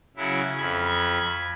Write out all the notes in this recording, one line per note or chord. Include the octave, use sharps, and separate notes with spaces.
C#3 F#3 E4
F2 B5 G#6